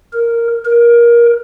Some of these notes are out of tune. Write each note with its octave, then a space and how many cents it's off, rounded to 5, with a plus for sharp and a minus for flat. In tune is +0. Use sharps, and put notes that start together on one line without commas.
A#4 -5
A#4 +20